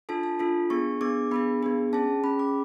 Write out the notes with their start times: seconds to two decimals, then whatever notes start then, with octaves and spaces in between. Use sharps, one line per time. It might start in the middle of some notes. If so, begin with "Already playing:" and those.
0.09 D4 F4 A4 A5
0.23 A5
0.39 D4 F4 A4
0.70 B3 D4 G#4 C#6
1.01 B3 D4 G#4 D6
1.31 B3 D4 G#4 B5
1.63 B3 D4 G#4
1.93 C#4 G#4 A5
2.24 C#4 G#4 B5
2.39 D6